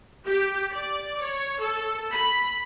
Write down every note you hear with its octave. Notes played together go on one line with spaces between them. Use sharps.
G4
D5
C#5
A4
B5